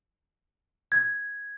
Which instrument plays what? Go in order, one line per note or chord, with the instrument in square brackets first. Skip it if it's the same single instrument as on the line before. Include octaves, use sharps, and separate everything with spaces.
[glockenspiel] G#6